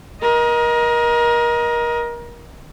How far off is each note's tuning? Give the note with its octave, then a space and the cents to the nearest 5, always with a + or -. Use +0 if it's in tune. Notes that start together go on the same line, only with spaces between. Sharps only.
A#4 +30 D#5 +10